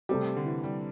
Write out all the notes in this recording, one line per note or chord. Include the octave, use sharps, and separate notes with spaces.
C3 G3 A3 C4 G4
D3
E3
G3